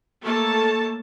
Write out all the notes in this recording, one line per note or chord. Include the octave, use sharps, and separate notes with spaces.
A3 A#3 A4 C#5 A5